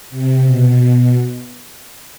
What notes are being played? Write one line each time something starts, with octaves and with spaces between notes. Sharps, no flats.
C3
B2